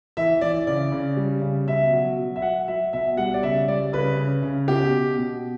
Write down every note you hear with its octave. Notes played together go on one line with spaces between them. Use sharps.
E3 E5
E3 D5
C#3 D5
C#3
G3
C#3
B2 E5
F#3
F#3
E5
F#3 F#5
F#3 E5
B2 E5
G3 F#5
D5
C#3 E5
G3 D5
C#3 B4
C#3
C#3
B2 G4
B2
B2